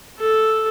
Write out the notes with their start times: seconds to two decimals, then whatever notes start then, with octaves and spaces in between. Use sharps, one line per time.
0.19 A4